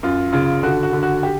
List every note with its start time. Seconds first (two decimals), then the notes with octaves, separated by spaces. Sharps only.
0.03 F#2 F4
0.33 C#3 F4
0.63 D3 F#4
0.83 F#4
0.93 D3
1.03 F#4
1.23 G4